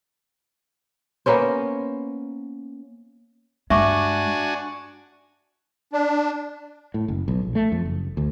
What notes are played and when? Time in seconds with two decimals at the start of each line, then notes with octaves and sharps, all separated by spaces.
1.26 A#3 B3 C#4 C5
3.70 G2 G#3 D4 F#4 E5 G#5 C#6 D6
5.93 D4
6.94 A2
7.08 F#1
7.28 B1
7.42 A#1
7.55 A3
7.72 F2
7.86 F#1
8.17 D2